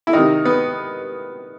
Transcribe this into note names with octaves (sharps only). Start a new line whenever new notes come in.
E4
C3 D#3 D#4
B3